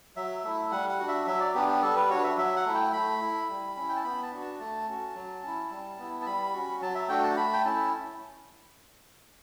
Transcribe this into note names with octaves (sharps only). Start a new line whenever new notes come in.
F#3 E5
A3 E4
G3 F#5
F#5
D4 F#4
E5
F#3 E5
D5
B3 D4 G4
G4
G3 A4
B4
D4 F#4 C#5
E5
F#3 E5
F#5
A3 E4
G5
A3 B5
E4
G3
C#4 E4
G5
A5
B3 B5
A5
D4 F#4
A5
A3 A5
C#4 F#4
F#3
C#4 E4
G3
B3 E4
A5
G3 B5
C#4 F#4
F#3 A5
E5
A3 D4 F#4 G5
A5
A3 B5
G5
C#4 E4 A5